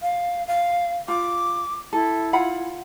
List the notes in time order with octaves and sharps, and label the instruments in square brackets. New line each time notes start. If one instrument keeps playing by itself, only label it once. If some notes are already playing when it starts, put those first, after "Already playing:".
[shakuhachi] F5
F5
[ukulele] F4 [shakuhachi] D6
[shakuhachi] E4 [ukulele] A4
[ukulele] F4 F#5 B5